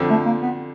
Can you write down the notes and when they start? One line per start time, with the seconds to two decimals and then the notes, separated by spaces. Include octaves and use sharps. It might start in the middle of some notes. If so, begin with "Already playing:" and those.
Already playing: F2 D3 F3
0.10 A3
0.26 A#3
0.42 B3